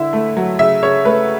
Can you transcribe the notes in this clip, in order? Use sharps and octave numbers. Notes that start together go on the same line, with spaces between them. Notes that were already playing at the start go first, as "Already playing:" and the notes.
Already playing: D3 E4 E5
A3
F#3
C#3 E5
C#3 C#5
A3 B4